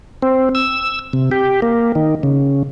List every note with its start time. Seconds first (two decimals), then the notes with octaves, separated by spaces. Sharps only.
0.22 C4
0.55 E6
1.13 C3
1.31 G4
1.62 A#3
1.95 D#3
2.23 C#3